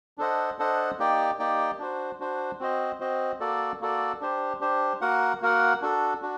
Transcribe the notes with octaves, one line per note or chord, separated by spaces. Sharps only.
D4 A4 C5 D#5 F#5
D4 A4 C5 D#5 F#5
A#3 D#4 G4 D5 G5
A#3 D#4 G4 D5 G5
D4 F#4 C5
D4 F#4 C5
C4 F#4 C5 D#5
C4 F#4 C5 D#5
A#3 F#4 A4 D5
A#3 F#4 A4 D5
D4 G4 C5
D4 G4 C5
A#3 F#4 A#4 F#5
A#3 F#4 A#4 F#5
D4 F#4 A4
D4 F#4